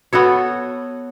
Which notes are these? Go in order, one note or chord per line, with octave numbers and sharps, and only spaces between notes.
B3 F#4 A4 C#5